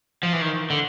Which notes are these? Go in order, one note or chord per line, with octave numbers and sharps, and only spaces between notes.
F3
E3
D#3
D3